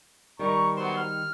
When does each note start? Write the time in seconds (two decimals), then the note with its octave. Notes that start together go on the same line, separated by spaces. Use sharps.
0.39 D#3 G3 A#5 C#6
0.76 F#3 B3 C5
0.97 F6